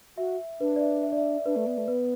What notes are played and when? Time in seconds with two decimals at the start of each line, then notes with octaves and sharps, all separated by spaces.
0.18 F#4 E5
0.60 D4 B4
0.76 D5
0.81 E5
1.03 E5
1.12 D5
1.17 E5
1.46 D4 B4
1.56 A3
1.67 B3
1.78 A3
1.88 B3 B4